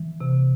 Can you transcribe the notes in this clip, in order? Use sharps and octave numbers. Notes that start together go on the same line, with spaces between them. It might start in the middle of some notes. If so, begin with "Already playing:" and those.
Already playing: E3
C3